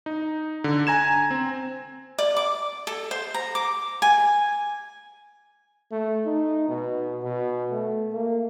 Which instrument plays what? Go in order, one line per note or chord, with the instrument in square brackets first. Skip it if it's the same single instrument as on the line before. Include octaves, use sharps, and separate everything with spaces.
[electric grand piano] D#4
D3
G#5 A#5 G#6 E7
C4
[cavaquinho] D5
D6
A4
C5
A#5
D6
G#5
[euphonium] A3
D#4
B2
B2
A3
A#3